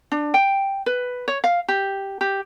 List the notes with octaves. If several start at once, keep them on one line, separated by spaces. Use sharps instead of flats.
D4
G5
B4
C#5
F5
G4
G4